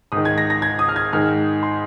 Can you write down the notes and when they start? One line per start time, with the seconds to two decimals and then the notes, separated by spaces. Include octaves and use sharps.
0.12 G#2 D#3 D#6
0.25 G#6
0.38 A#6
0.50 A#6
0.62 G#6
0.79 D#6
0.88 F6
0.96 G#6
1.13 G#2 D#3 F6
1.63 C6